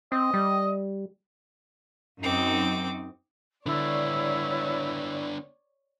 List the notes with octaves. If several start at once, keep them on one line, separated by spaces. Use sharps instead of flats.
C4 D#5
G3
F#2 C4 D#4 F#4 D6
D3 B3 D4 E4 C#5 D5